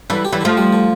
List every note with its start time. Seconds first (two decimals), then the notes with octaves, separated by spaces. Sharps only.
0.10 D3 E3 G3
0.25 G4
0.32 E3 G3
0.41 D3 F3 A3
0.57 G3
0.73 D3